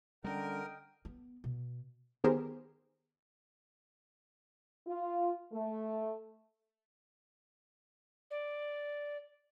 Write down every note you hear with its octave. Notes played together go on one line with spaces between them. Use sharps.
D3 G3 G#3 C#4 A#4 D#5 F#5 G5
B3
B2
D#3 B3 G4 G#4 A#4 C5
F4
A3
D5